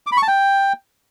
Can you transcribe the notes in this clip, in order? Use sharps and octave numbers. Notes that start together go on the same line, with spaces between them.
D6
B5
C#6
A5
G5